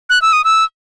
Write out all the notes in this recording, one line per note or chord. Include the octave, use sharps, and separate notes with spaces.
F#6
E6
D#6
E6